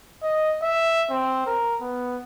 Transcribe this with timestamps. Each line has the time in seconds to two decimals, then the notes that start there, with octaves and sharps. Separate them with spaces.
0.23 D#5
0.63 E5
1.10 C4
1.47 A#4
1.81 B3